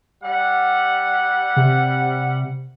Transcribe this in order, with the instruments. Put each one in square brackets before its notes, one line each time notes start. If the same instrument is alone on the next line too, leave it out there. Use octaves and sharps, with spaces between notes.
[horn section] G3 F#5
[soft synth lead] C3